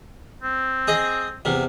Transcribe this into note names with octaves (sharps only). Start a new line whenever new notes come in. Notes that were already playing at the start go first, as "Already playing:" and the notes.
C4
G#4 D#5
E2 C3